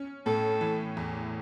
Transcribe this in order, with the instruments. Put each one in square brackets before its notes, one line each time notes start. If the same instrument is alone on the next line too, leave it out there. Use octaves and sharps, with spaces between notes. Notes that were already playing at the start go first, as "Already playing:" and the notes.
Already playing: [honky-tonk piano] C#4
[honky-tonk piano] A2 [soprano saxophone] A4
[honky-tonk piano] E3
E2